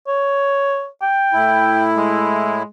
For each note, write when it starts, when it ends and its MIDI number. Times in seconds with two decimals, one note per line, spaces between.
0.08 0.87 73
1.02 1.85 79
1.33 2.63 45
1.33 2.63 64
1.97 2.66 56